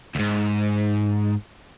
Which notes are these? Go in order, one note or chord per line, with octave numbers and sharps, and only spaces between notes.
D2 G#2